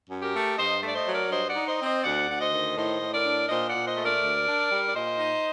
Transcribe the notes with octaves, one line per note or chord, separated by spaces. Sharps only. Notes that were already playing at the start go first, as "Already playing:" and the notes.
F#2
G4 A#4
A3
G2 C5 D#5
A3
D5
C5 D#5
F#3
A#4 D5
G2 C5 D#5
D5 F#5
D#4
C5 D#5
C4
C5 D#5
D2 D5 F#5
D2 F#5
C5 D#5
D#3
A2 C5 D#5
A2
A#4 D5
D4
A#2 C5 D#5
D5 F#5
A#2
C5 D#5
A3
A#4 D5
D2
D4
G3
D5
A#2 C5 D#5
D#4